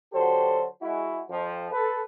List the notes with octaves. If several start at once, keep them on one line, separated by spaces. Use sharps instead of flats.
D3 F#3 F#4 G4 A4 C5
G#3 E4 F#4
F2 F3
A4 B4